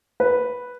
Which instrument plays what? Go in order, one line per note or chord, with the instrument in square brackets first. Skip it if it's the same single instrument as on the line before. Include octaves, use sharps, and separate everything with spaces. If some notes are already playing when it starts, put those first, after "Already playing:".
[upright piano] B4